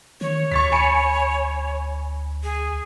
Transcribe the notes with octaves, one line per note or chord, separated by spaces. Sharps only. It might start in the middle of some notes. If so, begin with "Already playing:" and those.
D#3 C#5
D2 C#6 A6 B6
G#5 B5 C#7
G#4